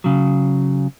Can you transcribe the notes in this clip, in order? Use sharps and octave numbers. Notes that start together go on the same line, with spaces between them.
C#3 F#3